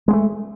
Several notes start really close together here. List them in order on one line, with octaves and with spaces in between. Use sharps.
G#3 B3 A3